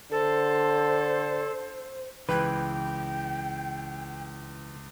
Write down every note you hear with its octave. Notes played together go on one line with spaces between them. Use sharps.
D3 A4 C5
C#2 E3 B4 G5